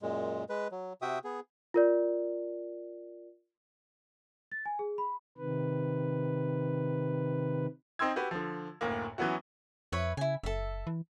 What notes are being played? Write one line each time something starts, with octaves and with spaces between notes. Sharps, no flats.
F#2 A#2 G#3
G#3 B4
F#3
C3 F#4 E5 G5 D#6
B3 G#4
F4 A#4 D5
A6
G#5
G#4
B5
C3 D#3 B4
C4 D#4 G5 C6 E6 G#6
F#4 G4 B4
D3 F3
F#1 D2 A2 A#3
E3 F#3 B3 C#4 E4 F#4
F2 B4 C#5 E5
C#3 E4 G#5
F#1 A4 E5
E3